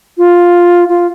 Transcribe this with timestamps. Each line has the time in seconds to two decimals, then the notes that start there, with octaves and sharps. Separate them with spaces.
0.18 F4
0.89 F4